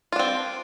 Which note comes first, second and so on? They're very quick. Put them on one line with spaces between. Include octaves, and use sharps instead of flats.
F4 D4 C4